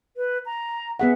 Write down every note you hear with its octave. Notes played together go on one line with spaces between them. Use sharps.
B4
A#5
B3 G#4 E5 F#5